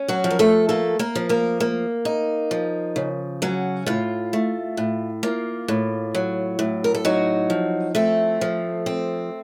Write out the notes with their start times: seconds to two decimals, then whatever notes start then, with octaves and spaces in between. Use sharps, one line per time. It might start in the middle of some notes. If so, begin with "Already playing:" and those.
Already playing: C#4
0.08 F#3 F#4
0.24 F3
0.31 A#4
0.39 A3 A4
0.69 A3 A#3 A4
0.99 A#3 A#4
1.15 F3
1.29 A#3 A#4
1.60 A#3
2.05 D#4
2.51 F3
2.96 C#3
3.42 F#3 C#4 F#4
3.86 A2 F4
4.33 A3
4.77 A2
5.23 A#3 F4
5.68 A2
6.15 F#3
6.59 A2
6.84 A#4
6.95 A4
7.05 F#3 D#4 F#4
7.50 F3
7.95 A3 C4 A4
8.41 F3
8.86 C4